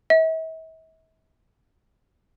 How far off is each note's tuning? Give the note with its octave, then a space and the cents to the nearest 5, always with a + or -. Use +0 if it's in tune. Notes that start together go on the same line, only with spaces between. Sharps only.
E5 -45